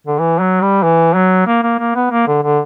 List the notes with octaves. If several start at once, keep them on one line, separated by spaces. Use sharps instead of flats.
D3
E3
F#3
G3
E3
F#3
A#3
A#3
A#3
B3
A#3
D3
D3